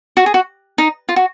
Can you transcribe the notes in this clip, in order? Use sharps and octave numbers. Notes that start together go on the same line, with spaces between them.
F#4
G#4
F#4
D#4
F4
F#4